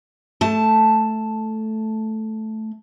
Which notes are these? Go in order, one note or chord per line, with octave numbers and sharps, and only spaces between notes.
A3 A5